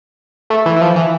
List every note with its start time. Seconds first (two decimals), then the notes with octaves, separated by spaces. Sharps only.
0.50 A3
0.66 E3
0.76 E3
0.82 F3
0.96 E3